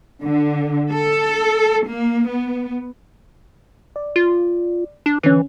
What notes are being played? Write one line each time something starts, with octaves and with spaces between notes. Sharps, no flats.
D3
A4
A#3
B3
D5
F4
D4
D3 E3 C#4